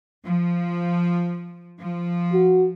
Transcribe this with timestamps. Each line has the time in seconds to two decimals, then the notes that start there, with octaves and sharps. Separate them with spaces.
0.24 F3
1.82 F3
2.34 F#4